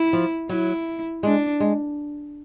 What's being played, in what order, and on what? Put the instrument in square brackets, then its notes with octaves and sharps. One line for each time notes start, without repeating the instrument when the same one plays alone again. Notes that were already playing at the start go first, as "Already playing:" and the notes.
Already playing: [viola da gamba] E4
[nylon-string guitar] F3
[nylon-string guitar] F#3 [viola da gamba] E4
[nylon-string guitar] G#3 [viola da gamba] D4
[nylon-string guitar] G#3